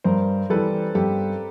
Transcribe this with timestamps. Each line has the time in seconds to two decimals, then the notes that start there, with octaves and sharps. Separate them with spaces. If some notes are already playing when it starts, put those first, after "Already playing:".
0.04 G2 A#4 C5
0.50 E3 G3 A4 B4
0.95 G2 G4 A4